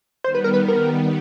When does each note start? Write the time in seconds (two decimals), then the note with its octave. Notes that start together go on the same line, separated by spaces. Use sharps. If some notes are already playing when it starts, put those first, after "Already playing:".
0.24 D#3 G3 B3 C5
0.35 B4
0.44 A#4
0.54 B4
0.68 A#4